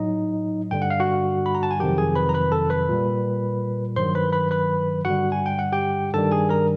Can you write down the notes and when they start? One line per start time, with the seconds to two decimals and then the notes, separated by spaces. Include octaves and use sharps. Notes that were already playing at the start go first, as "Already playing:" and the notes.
Already playing: A2 F#3 D#4 D#5
0.71 G2 D3 G3 G5
0.82 F#5
0.90 F5
1.00 F#4 F#5
1.46 B5
1.55 A#5
1.63 A5
1.71 G#5
1.80 F2 C3 D#3 F#3 G4 G5
1.98 G#4 G#5
2.16 B4 B5
2.29 A#5
2.34 B4 B5
2.52 A4 A5
2.70 B4 B5
2.89 A#2 G3
3.96 G2 D#3 F#3 C5 C6
4.15 B4 B5
4.32 B4 B5
4.51 B4 B5
5.05 G2 D3 G3 F#4 F#5
5.32 G#5
5.46 G5
5.59 F#5
5.72 G4 G5
6.14 G2 D#3 G3 A4 A5
6.32 G#4 G#5
6.49 A#4 A#5